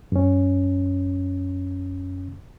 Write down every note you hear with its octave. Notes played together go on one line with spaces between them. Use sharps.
F#2 C#4